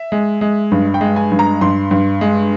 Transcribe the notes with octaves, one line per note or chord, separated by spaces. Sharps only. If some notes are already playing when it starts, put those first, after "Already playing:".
Already playing: E5
G#3
G#3
G2
G5
G#3
G#5
G2
A#5
G2 C6
G2
G#3